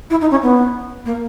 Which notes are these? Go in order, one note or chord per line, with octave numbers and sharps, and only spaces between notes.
E4
D#4
C#4
B3
A#3